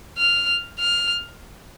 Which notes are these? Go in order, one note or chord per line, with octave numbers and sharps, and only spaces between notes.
F6
F6